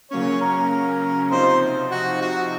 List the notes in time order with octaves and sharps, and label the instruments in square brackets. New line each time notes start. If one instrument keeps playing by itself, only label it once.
[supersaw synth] C#3 F#3 A#3 C#4 [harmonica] C#5
[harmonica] A#4
[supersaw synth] C3 F3 C4 D#4 [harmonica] C5
[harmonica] F#4
F#4